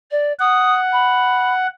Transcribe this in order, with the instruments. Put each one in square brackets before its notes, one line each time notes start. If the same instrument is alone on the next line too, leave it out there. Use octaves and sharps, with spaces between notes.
[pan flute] D5
[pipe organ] F#5 [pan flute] D#6
[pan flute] B5